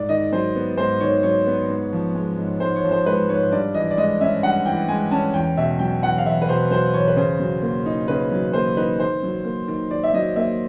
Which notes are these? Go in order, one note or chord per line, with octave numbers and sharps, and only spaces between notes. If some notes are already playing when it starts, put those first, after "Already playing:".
Already playing: G#2 D5
D#3 D#5
F#3 C5
B3
G#2 C5
D#3 C#5
F#3 C#5
B3
G#2
F3
G#3
G#2
G#2 C5
C#5
F3
C5
G#3 B4
G#2 C#5
G2 D5
E3 D#5
D5
G#3 D#5
C#4 E5
G2 F#5
E3 G5
G#3 G#5
C#4 A5
E2 G5
B2 E5
F#3 G5
E2 F#5
F5
E2 E5
B4
B2 C5
F#3 C5
E2 C#5
B4
C#3 C5
F#3
A#3
D#4
C#3 B4
F#3
A#3 C5
D#4 B4
D#3 C5
F#3
A#3
D#3
D#3 D5
E5
F#3 D#5
A#3 E5